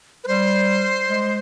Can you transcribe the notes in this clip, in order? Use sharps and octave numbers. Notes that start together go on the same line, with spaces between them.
B4
G3 C5
G#3